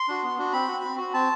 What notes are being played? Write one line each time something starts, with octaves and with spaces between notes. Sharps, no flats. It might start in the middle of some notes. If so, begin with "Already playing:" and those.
Already playing: C6
D4 F#4
B3
D4 F#4
C4 B5
F#4
C4
F#4
C4 A5